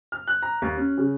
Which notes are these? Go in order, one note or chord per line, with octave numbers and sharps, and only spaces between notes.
F6
F#6
A#5
D#2
C#4
C#3